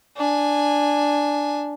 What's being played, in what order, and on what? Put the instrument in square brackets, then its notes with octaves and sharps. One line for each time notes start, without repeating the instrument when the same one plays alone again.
[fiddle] D4 G#5